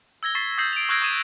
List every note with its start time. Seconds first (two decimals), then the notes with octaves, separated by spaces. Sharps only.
0.23 E6 G#6 A#6 G7
0.35 C#6 A6 B6 C7
0.58 D#6 E6 G6 A#6 C7 F#7
0.73 D7 F7
0.89 C#6 E6 F#6 G#6 A#6 D7
1.02 C#6 D#6 G6 G#6 D#7 E7